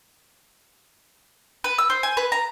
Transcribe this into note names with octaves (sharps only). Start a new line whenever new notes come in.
B4
E6
C5
G#5
B4
A#5